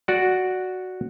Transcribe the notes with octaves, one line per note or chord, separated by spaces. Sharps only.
F#4 D5